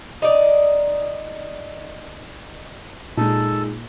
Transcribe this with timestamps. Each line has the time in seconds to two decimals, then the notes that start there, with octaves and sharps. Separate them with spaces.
0.22 D#4 D5
3.17 A#2 G#3 D#4 A4 A5